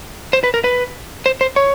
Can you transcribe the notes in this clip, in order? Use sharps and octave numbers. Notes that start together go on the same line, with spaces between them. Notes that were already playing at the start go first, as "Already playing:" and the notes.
C5
B4
A#4
B4
C5
C5
C#5